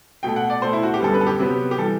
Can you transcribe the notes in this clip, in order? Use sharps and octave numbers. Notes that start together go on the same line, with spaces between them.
B2 A3 G5
F#5
D5
B2 A3 C5
E4
F#4
G4
F#2 D3 G3 B3 A4
B4
A4
G4
C3 F#3 B3
G4
E3 G3 A4